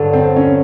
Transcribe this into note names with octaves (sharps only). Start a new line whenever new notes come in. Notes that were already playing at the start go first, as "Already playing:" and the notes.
Already playing: G2 D3 F#3
C4
C#4